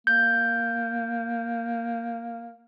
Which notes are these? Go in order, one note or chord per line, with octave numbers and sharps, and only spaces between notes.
A#3 G6